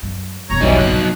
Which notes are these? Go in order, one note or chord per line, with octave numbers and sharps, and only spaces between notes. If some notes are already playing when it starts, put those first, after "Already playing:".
F#2
E1 F#2 C#5 A#5
B1 E3 F#3 G3 D#4 C#5 D#5
A#1 G2 A#2 C#3 F#6
C7